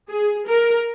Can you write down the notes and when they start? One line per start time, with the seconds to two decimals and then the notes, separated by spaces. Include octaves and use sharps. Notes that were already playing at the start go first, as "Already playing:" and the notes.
0.10 G#4
0.48 A#4